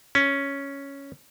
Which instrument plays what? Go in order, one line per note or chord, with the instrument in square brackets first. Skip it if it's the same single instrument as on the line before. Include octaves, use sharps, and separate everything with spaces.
[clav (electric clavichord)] C#4